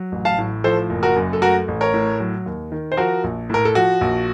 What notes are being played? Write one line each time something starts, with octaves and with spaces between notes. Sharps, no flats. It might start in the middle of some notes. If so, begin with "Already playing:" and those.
Already playing: F#3
A1
F5 A5
A2
F3 A4 C5
F#1
F#4 A#4
F#2
A4
A3 F#4 A#4
A1
A#4 C#5
A2
F#3
D#2
D#3
C5
F3 F#4 A#4
A#1
A2 A#4
A4
F3 F#4
A#1